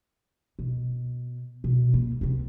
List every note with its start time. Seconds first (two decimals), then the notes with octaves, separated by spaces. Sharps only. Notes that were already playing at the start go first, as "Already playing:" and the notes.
0.59 B2
1.64 B2
1.94 A#3
2.21 C2 C3